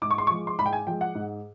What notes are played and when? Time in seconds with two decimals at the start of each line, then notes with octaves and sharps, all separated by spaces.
0.02 G#2 D6
0.11 C#6
0.18 C6
0.27 F3 G#3 C#6
0.47 C6
0.59 G#2 B5
0.66 G5
0.73 G#5
0.87 F3 G#3 G5
1.01 F#5
1.15 G#2